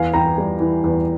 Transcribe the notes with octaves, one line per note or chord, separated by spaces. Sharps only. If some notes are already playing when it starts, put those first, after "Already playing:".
Already playing: E2 F5 G#5
E3 G5 A#5
G3
E3
E2